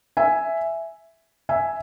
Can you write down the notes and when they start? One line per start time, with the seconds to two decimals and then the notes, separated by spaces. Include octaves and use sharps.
0.17 E5 G#5
1.49 E5 G#5